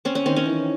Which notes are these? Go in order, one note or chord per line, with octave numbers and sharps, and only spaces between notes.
C4 C#4
C#4
D#3 C4
C#4
E3